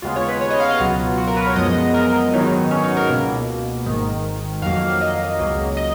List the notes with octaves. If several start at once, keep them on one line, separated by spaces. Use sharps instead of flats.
D#2 C#3 G#3 B3 F4
C#5
B4
C#5
D#5
F5
D#5
C#2 B2 F#3 B3 F4
F#4
A#4
B4
C#5
F#2 F3 G#3 B3 D#5
A#4
G#2 D#3 F#3 B3 D#4
C#4
D#4
A#4
C#2 B2 A#3
G#1 G#2 D#3
F2 D#3 F#3 A#3 F5
D#5
C#2 C#3 F#3 A#3
D#5